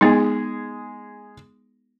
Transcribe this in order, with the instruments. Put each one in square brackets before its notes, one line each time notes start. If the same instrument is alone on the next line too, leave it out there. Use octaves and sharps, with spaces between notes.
[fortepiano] G#3 G#4 [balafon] B3 D#4